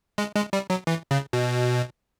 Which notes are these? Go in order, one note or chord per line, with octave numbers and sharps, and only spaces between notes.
G#3
G#3
G3
F#3
E3
C#3
B2